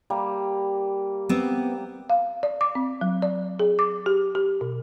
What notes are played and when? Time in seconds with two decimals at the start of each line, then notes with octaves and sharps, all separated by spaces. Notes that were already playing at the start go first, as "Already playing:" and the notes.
0.10 G3 A#3
1.29 B3 C4
2.10 F5
2.43 D5
2.61 D6
2.75 C4
3.01 F#3
3.22 D5
3.60 G#4
3.79 D6
4.06 G4
4.35 G4
4.61 B2